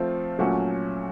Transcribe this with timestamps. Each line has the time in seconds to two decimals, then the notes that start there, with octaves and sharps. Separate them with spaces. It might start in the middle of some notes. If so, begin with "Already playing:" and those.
Already playing: F3 A3 C4 F4
0.39 A#2 F#3 A3 C#4 F#4